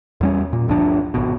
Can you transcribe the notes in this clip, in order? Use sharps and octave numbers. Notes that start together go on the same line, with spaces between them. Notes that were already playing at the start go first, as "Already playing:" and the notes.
E2 G3 C#4
A#2
G1 D2 F3 D4
G#1 B2